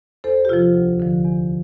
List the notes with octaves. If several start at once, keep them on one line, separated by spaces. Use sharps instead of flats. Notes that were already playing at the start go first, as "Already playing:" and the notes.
E2 A4 C5
G4
C3 F3 F4
D2
D3 F3
E2